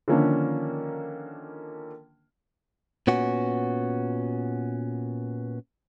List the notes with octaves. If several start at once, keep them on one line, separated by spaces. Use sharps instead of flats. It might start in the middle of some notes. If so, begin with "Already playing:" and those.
D3 D#3 F3 A#3 C#4 D4
A#2 B3 C#4 F#4